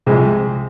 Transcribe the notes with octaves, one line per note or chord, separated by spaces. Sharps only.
C2 C3 F3 G#3 G#4